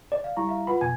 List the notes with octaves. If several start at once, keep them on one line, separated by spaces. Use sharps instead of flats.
D5
F5
G3 E4 A#5 C#6
E5 F5
F4 B4 F#5 B5
F2 B2 G#5 G#6